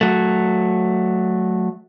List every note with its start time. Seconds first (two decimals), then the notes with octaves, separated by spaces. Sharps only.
0.01 F#3 A3